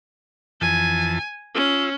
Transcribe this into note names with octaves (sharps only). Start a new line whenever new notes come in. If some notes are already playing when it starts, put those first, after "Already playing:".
F2 E3 G#5 A5
C#4 F4 E6